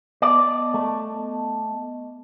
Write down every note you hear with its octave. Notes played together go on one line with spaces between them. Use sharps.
B3 D5 D#5 A5
A3